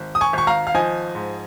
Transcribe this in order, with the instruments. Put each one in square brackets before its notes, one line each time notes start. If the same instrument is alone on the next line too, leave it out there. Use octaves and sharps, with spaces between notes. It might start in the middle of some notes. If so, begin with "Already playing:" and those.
Already playing: [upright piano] G#1
D#6
G#5 C#6
G#1 C#6
F5 A#5
F5
F3 D#5 G#5
G#2